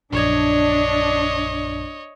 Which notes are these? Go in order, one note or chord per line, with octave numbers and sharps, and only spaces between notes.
A#1 F#2 D4 C#5 D#5 G#6